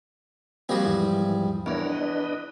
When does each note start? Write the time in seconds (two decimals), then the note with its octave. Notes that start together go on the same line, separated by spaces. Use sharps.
0.69 F3 G3 A#3 C4 F#4 G#4
0.86 E2 G#2 E3
1.66 E2 D4 A#4 C#5
1.90 D4 B4 D#5